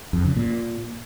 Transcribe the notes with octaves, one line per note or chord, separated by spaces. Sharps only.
F2
C#3
A#2